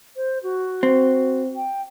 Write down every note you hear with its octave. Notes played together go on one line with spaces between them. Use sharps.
C5
F#4
C4
G5